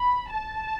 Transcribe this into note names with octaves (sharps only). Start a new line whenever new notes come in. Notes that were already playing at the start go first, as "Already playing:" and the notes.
Already playing: B5
A5